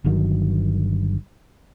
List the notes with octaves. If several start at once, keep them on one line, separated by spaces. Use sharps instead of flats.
G1 G2 D#3 F#3